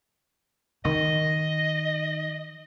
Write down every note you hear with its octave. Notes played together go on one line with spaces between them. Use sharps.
D#3 D#5